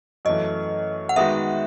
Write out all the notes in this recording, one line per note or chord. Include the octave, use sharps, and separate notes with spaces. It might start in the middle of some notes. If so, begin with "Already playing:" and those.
F#2 E3 A3 D#5
F#5
D#3 G#3 B3 D#4 F#4 E5